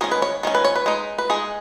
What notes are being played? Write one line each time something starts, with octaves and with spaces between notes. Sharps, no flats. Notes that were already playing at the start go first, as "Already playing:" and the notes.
D#3 G#3 C#4 G#4
B4
C#5
D#3 G#3 C#4
B4
C#5
B4
G#3 D#4
B4
G#3 D#4 G#4